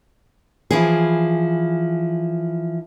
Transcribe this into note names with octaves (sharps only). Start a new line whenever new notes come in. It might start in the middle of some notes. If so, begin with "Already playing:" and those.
E3 F3 G#4